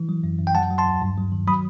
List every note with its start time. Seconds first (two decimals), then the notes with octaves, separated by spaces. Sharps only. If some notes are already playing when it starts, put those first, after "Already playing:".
Already playing: E3
0.09 F#3
0.24 F#2
0.39 F#2
0.47 G5
0.55 F#3 F#5 A5
0.71 F#3
0.78 A5 C6
0.86 D#2
1.02 G2
1.17 F#3
1.32 D#3
1.48 F#3 B5 D#6